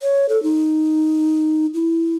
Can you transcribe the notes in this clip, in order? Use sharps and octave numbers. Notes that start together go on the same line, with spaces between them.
C#5
A4
D#4
E4